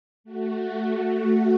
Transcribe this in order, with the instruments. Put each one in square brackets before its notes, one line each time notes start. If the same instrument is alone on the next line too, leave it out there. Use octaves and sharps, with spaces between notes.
[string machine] A3 F#4